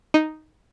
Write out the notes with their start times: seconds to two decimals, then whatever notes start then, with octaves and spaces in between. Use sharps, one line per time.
0.14 D#4